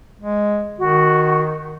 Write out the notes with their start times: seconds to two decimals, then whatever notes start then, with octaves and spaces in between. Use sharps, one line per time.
0.21 G#3
0.78 D#3 F#4